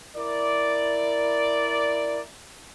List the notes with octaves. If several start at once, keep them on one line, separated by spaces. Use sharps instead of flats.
E4 A#4 D5